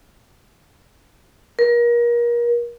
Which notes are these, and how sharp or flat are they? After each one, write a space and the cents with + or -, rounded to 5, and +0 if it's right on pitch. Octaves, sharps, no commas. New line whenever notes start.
A#4 +30